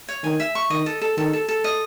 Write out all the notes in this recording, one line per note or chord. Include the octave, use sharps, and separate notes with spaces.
C#5
D#3 G#5
E5
C#6
D#3 D#5
A4
A4
D#3 A4
A4
A4
D#5